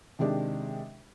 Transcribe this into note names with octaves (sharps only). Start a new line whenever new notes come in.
C3 D#3 G#3 D4 G4